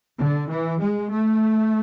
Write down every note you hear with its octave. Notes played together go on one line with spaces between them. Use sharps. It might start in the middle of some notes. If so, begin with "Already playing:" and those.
D3
E3
G#3
A3